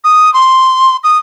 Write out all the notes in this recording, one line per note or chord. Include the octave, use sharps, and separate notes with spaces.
D#6
C6
D#6